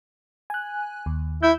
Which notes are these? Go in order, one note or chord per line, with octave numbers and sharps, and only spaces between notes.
G#5 F#6
D#2
E4 E6 G6